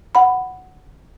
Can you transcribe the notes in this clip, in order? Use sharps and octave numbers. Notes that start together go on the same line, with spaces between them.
F#5 B5